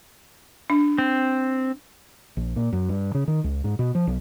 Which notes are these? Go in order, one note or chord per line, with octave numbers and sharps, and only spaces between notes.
D4
C4
A#1
A#2
F#2
G2
C#3
D#3
C#2
G#2
B2
F3
B1